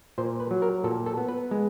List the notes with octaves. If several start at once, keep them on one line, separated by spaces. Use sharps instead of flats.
A#2 C5
B4
F#3
A#4
A#2 A4
A4
B3
B4
G#3